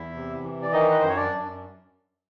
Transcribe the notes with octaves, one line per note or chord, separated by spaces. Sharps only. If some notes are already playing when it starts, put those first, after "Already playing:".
Already playing: E2 E4 E5
C3
E3
D5
D#3 D#4 D#5
B4
F#2 C5
C#5
D4 D5
F#2